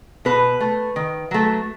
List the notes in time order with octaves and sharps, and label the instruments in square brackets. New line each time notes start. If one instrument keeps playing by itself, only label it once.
[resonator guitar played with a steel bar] B2 B4
A3
D#3
F#3 A3